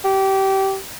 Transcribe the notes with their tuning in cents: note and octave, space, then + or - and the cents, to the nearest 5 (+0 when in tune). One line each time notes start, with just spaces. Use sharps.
G4 -25